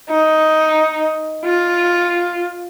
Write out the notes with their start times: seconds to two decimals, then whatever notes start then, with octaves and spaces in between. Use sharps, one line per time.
0.10 D#4
1.45 F4